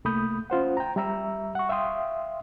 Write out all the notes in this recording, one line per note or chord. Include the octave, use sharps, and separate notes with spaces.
C2 A3 A#3 B5 D#6 G6
C#4 F4 C5 F#5
G5 A#5
G3 E5 A#5 E6
F#5 C#6
E5 F5 G5 C6 D#6